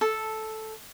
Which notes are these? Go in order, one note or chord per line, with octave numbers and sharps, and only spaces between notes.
A4